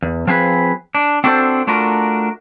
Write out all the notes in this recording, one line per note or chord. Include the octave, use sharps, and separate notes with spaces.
E2
F3 C4 G#4 B4
D4
C4 D4 F#4 A4 A#4 C5
A3 D4 F4 F#4 A#4